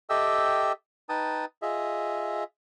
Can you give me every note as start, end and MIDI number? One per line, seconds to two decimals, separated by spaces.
0.10 0.72 67
0.10 0.72 69
0.10 0.72 75
0.10 0.72 76
0.10 0.72 79
0.10 0.72 88
1.09 1.45 63
1.09 1.45 71
1.09 1.45 79
1.09 1.45 81
1.09 1.45 87
1.62 2.44 65
1.62 2.44 68
1.62 2.44 75
1.62 2.44 76